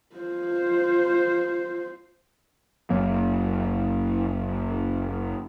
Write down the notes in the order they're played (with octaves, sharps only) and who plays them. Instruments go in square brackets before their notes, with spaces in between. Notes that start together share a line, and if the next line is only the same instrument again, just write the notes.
[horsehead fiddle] F4 C5
[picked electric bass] F#1 F#3 A#3